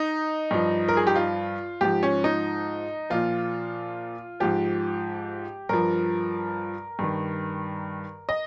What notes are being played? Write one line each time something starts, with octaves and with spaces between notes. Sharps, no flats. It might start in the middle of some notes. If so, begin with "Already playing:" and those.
Already playing: D#4
G2 F3
A#4
G#4
G4
F4
G#2 F3 G4
C#4
D#4
A#2 F3 F4
G#2 F3 G4
G2 F3 A#4
G2 D#3
D#5